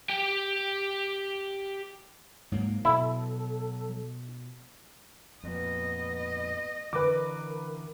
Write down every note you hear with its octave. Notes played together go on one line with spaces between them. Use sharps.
G4 G5
G#2 F#3 A#3
B2 E4 A4
F2 A#2 B3 D#5
D3 E3 A#4 B4 D6